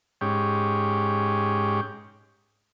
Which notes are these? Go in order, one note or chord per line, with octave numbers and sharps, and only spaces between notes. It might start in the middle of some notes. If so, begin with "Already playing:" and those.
G#2 C#4 G4